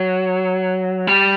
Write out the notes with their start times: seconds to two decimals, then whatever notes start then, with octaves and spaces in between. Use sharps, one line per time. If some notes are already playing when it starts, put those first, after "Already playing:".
Already playing: F#3
1.07 G3